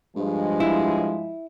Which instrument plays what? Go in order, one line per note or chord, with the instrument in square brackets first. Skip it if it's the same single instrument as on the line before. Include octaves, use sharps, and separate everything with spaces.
[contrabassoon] G2 [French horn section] F3 G#3
[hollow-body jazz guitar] E4